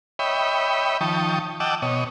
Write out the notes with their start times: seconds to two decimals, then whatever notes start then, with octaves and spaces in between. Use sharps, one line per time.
0.19 C#5 D#5 E5 G5 B5
1.01 D#3 F3 G5 A5 C#6 D#6
1.60 D#5 F#5 G5 A5 D6 E6
1.82 B2 C#5 D#5